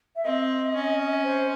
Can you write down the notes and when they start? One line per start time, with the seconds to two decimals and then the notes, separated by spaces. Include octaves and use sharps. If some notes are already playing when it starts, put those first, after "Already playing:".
0.16 E5
0.25 C4 D#5
0.74 C#4
1.24 C5